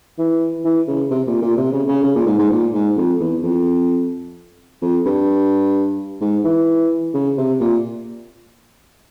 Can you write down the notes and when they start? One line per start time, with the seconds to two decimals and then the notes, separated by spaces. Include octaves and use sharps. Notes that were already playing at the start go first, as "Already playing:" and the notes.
0.18 E3
0.64 E3
0.87 C#3
1.10 C3
1.26 A#2
1.42 A#2
1.57 C3
1.72 C#3
1.88 C#3
2.03 C#3
2.15 A#2
2.27 G#2
2.39 G#2
2.50 A#2
2.73 G#2
2.96 F2
3.19 E2
3.42 F2
4.82 F2
5.05 G2
6.21 G#2
6.44 E3
7.14 C#3
7.37 C3
7.60 A#2